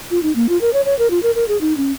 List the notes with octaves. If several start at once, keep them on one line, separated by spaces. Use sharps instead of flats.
F4
D#4
A#3
F4
A#4
C#5
C#5
A#4
F4
A#4
A#4
G#4
D#4
C#4